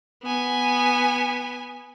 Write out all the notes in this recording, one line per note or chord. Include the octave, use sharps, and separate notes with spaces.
B3 G#5